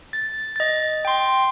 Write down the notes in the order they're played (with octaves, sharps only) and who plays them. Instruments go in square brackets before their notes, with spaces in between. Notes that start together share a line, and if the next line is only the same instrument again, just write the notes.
[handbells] A6
D#5 A6
G5 C6